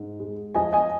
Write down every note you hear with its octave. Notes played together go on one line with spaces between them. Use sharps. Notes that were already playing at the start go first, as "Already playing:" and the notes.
Already playing: G#2
G#3
F3 D#5 G#5
D#5 G#5